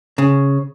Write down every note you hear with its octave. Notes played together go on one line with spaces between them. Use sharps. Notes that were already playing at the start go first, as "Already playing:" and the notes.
C#3